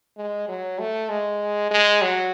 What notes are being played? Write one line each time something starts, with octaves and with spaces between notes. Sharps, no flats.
G#3
F#3
A3
G#3
G#3
F#3